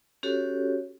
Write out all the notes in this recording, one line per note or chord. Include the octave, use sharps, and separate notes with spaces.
C#4 F#4 G4 A4 C#5